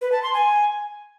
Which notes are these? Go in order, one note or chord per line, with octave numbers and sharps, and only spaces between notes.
B4
A5
C6
G#5